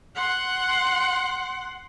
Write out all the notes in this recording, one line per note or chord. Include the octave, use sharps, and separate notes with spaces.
F#5 C6